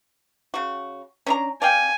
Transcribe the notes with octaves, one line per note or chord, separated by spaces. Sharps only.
C#3 F#4
C#4 D4 A#5
D5 F5 G5 G#5